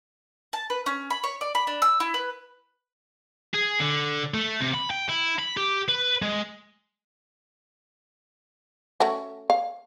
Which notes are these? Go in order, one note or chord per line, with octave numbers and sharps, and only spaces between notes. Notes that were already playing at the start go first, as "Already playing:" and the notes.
A5
B4
C#4
B5
C#5
D5
B5
D4
E6
E4
B4
G#4
D3
A3
C3
B5
G5
E4
B5
G4
B4
G#3
A3 C#4 F#4
F5